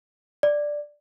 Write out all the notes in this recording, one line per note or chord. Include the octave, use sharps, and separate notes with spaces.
D5